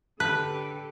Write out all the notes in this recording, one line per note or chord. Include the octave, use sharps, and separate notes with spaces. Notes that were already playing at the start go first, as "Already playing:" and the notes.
D3 G4 A4 B4 A5 F#6